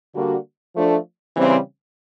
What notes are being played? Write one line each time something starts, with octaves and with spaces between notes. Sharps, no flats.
D3 G3 A#3 D4 F#4
F3 A3 D4
C#3 E3 G3 C4